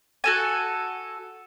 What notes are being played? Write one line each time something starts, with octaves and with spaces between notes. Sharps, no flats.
F#4 A4 G#5